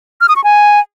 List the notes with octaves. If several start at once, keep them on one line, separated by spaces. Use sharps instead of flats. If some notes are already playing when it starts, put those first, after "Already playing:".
F6
D#6
C#6
G#5